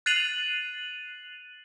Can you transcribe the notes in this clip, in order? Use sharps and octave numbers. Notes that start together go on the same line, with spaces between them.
F#6 A6 C7 D#7 F7 F#7